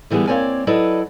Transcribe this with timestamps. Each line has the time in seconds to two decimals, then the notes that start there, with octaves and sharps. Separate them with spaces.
0.10 D3 E3 G3 B3 G#4
0.27 A#3 C4 C#5 D5 G#5
0.67 F#3 E4 A4 B4 D5 D#5